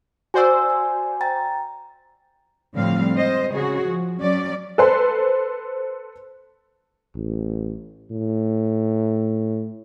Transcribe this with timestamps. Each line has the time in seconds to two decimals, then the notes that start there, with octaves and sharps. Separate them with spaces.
0.34 F#4 C5 D5 G#5 C6 E6
0.70 G#5
1.21 G5 A#5 A6
2.74 A2 D3 F3 G3 C4 F5
3.15 G#3 C5 D#5
3.51 C#3 F#4 G#4
3.86 F3
4.19 F#3 C#4 D5
4.78 A4 B4 C5 C6
7.15 A1
8.11 A2